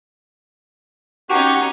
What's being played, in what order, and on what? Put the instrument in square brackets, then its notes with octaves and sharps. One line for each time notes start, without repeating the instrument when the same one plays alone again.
[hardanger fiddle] C#4 D#4 [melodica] F#4 G4 C#6